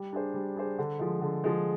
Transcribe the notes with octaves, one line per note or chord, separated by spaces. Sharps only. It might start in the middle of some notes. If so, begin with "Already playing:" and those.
Already playing: G3
D4 G#4 C5
G3
D4 G#4 C5
D3
F3 G#3
D3
F3 G#3